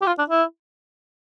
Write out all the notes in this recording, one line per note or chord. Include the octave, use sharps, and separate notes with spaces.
G4
F4
D4
E4